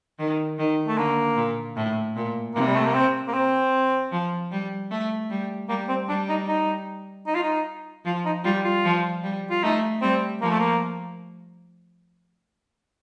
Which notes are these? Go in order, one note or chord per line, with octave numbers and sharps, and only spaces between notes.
D#3
D#3
A3
D3 A#3
A#2
A2
A#2
C3 A#3
G3
A3
A#3
C4
A#3
C4
F3
G3
A3
G3
G3 A#3
C4
G3 D4
D#4
D#4
D#4
F4
D#4
F3 F4
D#4
G3 F4
F4
F3
G3
F4
A3 D#4
G3 C4
F3 A#3
A3
A#3